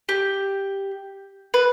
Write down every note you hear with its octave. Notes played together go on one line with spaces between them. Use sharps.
G4
B4